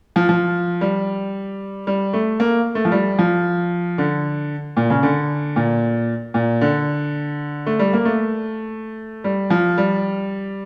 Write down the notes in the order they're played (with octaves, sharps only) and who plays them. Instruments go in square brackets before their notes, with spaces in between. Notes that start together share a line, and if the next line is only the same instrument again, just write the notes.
[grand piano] F3
F3
G3
G3
A3
A#3
A3
F3
G3
F3
D3
A#2
C#3
D3
A#2
A#2
D3
A3
G3
A#3
A3
G3
F3
G3